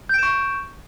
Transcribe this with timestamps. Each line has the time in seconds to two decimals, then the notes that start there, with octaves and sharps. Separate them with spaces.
0.09 G6
0.14 D7
0.18 E7
0.23 C#6